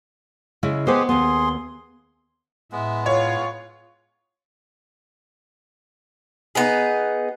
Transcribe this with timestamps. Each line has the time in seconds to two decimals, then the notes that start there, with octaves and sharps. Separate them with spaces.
0.63 C#3 G#3 E4
0.87 G#3 B3 G4 G#4 B4 C5
1.09 D#2 B3 G#4 C6
2.72 A2 G#3 B3 E5
3.06 F4 C#5
6.55 B3 D#4 G#4